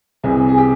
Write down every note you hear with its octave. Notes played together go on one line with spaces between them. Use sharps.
C2 C3 E3 G#4
G#4
G4